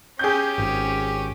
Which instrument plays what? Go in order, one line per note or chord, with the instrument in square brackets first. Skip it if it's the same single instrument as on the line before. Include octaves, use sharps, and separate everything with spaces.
[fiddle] C#4 G4 [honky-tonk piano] G#4 G6
[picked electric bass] G#1